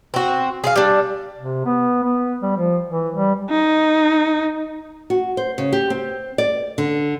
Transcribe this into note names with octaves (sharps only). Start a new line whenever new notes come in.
C4 F#4
G#4 C5 F5
G3 D4
C3
B3
B3
G3
F3
E3
G3
D#4
F#4
C5
C#3
G4
C4
D5
D3